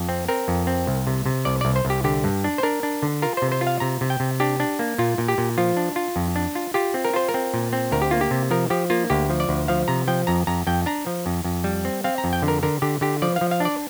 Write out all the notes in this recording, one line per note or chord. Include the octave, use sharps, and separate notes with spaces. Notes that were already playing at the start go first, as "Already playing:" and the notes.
Already playing: F2
C4
C4 A#4
F2
C4
C2
C3
C3
C2 D5
C2 D5
C5
C2
G4
D3 G4
G2
D4
C5
D4 A#4
D4
D3
F4 A#4
C3 C5
C5
F4
F5
C3 A#5
C3
G5
C3
D4 G4
D4
A#3
A#2 F4
A#2
G4
A#2
F3 F4
D4
F4
F2
D4
F4
F4 G4
C4
A#4
F4 C5
A#4
C4
A#2
C4
D2 A#4
G4
A#3 F4
G4
C3
F3 A#4
F3 G4
A#3 F4
D2 G4
F3
D5
D2
F3 F5
C3 A#5
F3 G5
F2 A#5
F2 A#5
F2 G5
D4 A#5
F3
F2
F2
G3
C4
C4 F5
A#5
F2
G5
D3
A#4
D3 A#4
D3 G4
D3 G4
F3 D5
F5
F3
F5
D4
D5